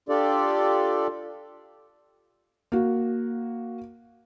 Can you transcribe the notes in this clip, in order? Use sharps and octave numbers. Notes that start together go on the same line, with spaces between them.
D4 F4 G4 A4 D5
A#3 F#4